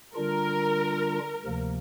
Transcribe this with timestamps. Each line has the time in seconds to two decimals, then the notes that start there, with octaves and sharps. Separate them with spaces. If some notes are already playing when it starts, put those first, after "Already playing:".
0.15 D3 G3 D4 F4 A#4
1.45 D2 C3 F3 A#3